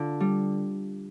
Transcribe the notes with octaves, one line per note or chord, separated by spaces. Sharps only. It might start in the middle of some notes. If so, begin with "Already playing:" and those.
Already playing: D3 F4
G3